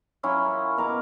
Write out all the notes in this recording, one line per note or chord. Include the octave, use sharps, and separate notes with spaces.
F#3 C#4 E4 F4
A#4
B2 A#4 D6